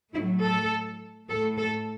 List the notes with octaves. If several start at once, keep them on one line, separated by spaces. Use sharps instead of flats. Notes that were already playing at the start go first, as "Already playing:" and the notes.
A2 F#3 A3 E4
A4
A2 A3 A4
A4